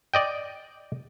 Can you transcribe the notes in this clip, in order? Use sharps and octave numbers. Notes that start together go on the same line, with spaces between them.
D5 D#5 G5